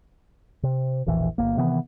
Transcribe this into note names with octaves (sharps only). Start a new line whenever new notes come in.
C3
E1 A#1 E3
G1 E2 A#3
C3 D#3 E3 B3